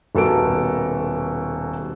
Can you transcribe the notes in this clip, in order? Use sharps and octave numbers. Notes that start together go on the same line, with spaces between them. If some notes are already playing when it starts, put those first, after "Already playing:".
D#1 B2 A4 A#4 D7